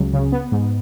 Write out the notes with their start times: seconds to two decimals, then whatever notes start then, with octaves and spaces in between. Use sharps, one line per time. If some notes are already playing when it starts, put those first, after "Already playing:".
Already playing: C#2 C#3 F#3
0.13 C#3
0.32 B3
0.52 G#2